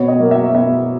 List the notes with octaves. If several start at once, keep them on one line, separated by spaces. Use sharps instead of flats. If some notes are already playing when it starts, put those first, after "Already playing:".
Already playing: B2 C#5
D#5
F#3 A#3
E5
B2 E5